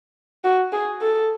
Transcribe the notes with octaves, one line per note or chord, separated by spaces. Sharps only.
F#4
G#4
A4